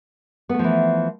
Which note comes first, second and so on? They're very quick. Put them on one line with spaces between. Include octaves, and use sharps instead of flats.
B3 A3 F3 E3